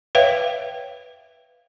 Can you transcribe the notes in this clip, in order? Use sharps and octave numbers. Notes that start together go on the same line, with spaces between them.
B4 C#5 E5 F5 G5